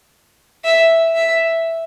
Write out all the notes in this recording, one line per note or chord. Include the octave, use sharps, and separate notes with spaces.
E5
E5